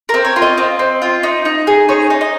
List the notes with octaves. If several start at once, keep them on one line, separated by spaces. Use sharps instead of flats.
C4 A#4
C#5
F4
D#5
C4
C4
F4
D#4
D#4
G#4
D#4 C#5
D#4
D#5